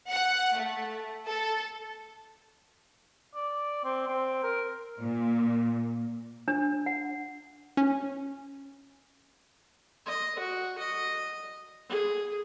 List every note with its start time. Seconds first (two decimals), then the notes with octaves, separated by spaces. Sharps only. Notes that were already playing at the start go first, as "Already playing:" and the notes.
0.11 F#5
0.57 A3
1.28 A4
3.35 D5
3.84 C4
4.08 C4
4.43 A#4
5.00 A#2
6.48 D4
6.86 F#5
7.77 C#4
10.06 D#5
10.39 F#4
10.78 D#5
11.89 G#4